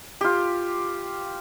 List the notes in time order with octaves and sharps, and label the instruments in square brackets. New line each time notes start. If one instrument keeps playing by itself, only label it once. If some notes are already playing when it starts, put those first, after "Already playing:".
[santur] F4 G4